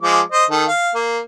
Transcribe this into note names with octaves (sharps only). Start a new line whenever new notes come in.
F3 G#3 D6
C5 D#5
D#3 A4
F5
A#3